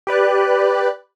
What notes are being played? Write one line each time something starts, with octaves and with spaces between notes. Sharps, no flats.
G4 B4 D5 F#6